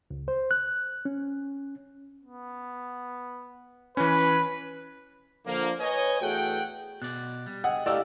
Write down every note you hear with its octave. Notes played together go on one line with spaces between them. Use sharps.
C#2
C5
F#6
C#4
B3
E3 C#4 B4
D3 F3 A#3
B4 C#5 D#5 G#5
E2 A3 F#4 G#4 F#5 G5
B2 D5 F#6
G3
G#4 D#5 F#5 G5 E6
A3 E4 G4 A#4 D5 F5 E6